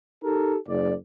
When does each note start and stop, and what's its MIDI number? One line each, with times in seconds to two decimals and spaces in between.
0.24 0.55 63
0.24 0.55 67
0.24 0.55 69
0.24 0.55 70
0.68 0.92 30
0.68 0.92 74